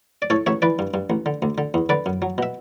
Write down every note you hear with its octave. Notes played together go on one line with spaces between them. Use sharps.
D5
A2 A4 C#5
A1 C#5 E5
E3 B4 D5
G2
G2
A1
D3
D2
D3
E2
D3 B4 D5
F#2
F#3
B2 E5